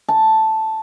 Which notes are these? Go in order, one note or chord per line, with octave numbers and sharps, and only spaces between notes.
A5